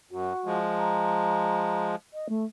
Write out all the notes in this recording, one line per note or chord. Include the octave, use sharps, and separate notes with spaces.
F#2 F#4
F3 G#3
A#5
D#5
A3